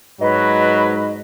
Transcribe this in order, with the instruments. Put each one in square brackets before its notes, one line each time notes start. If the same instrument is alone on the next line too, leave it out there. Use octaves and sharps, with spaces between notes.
[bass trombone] G#2 [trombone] F#3 [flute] B4 [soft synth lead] D#5